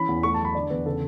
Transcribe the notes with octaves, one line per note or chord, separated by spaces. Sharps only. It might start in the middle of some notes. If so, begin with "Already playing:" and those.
Already playing: E3 C#4 B5
E2
A3 C#6
A5
F#3
B5
D3 D5
E2 B4
C#3 A4